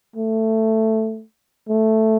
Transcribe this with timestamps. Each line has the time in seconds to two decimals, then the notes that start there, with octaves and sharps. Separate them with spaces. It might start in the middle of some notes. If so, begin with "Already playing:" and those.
0.16 A3
1.69 A3